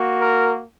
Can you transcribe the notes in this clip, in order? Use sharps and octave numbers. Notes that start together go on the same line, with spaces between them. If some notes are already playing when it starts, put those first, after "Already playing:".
Already playing: A#3 F#4
A#4